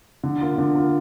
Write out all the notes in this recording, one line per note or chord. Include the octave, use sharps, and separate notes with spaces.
D3
A#3 F4
D3
A#3 F4